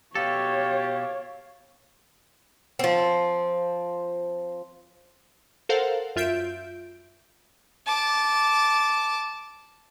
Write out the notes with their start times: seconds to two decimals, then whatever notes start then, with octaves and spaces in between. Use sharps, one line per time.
0.15 B2 G4 A4 C#5 F5
2.79 F3 C4
5.69 A4 A#4 C5 F5 F#5
6.16 F#2 F4 E5 G6 D7
7.87 A5 D6